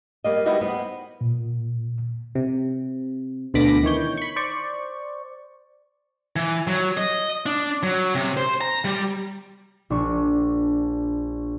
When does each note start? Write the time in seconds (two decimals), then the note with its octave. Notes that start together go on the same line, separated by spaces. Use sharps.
0.24 G3 A#3 D#5
0.46 G3 B3 D#4 E4 F#4 D#5
0.61 B3 C5 F#5
1.21 A#2
2.35 C3
3.54 D2 B2 D3 B5 D6 A#6
3.83 D#3 E3 C#5 G6
4.17 B5 C#6
4.36 C5 D5 C#6
6.36 E3
6.67 F#3
6.97 D#5
7.46 D4
7.83 F#3
8.15 C3
8.37 C5
8.61 A#5
8.85 G3
9.90 A#1 D4 C#6